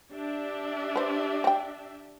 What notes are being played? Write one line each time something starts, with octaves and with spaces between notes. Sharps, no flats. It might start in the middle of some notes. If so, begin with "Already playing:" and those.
D4 G4 E5
B4 C5
C4 G5